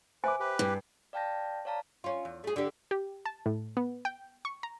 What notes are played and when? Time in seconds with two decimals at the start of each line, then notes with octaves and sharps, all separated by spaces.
0.24 B4 C5 E5 G#5 D6
0.40 G4 B4
0.59 G2
1.13 D5 F5 G5 A5 G6 A#6
1.65 C#5 D5 F5 A5 A#5
2.04 C#4 F4
2.25 E2
2.44 A3 G#4
2.56 D3 G4
2.91 G4
3.25 A5
3.46 A2
3.77 B3
4.05 G5
4.45 C#6
4.63 A#5